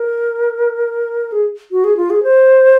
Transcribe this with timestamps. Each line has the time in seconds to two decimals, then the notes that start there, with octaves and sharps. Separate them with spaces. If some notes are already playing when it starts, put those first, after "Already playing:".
Already playing: A#4
1.32 G#4
1.72 F#4
1.84 G#4
1.97 F4
2.10 G#4
2.23 C5